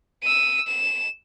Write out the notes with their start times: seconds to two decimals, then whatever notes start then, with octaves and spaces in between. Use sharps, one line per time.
0.23 E6 D#7
0.68 E7